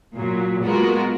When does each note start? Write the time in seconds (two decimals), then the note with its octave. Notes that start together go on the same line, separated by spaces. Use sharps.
0.15 A#2 F#3
0.62 G#3 B3 F4 F#4 A#4